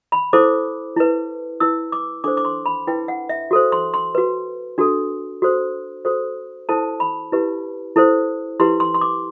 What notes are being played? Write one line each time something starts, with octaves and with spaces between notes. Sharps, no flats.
B5
E4 A4 C5 D6
E4 B4
E4 B4 E6
D6
D4 A4 C5 D6
D6
C6
B5
E4 B4 G5
F#5
E5
F#4 A4 C5
C6
C6
F#4 B4
D4 F#4 A4
F#4 A4 C5
F#4 A4 C5
E4 A4 C5 A5
B5
E4 G4 B4
E4 A4 C5
E4 G4 B4 C6
C6
C6
D6